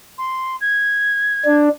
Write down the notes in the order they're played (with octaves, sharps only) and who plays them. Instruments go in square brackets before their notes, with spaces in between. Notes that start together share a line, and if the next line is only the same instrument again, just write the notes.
[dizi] C6
G#6
[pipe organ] D4